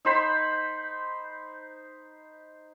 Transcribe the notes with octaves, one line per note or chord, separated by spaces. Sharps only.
D#4 C5 B5